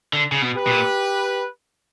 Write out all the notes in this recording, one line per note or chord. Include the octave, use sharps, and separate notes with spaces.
D3
C#3
B2
G4 B4
B2
A#2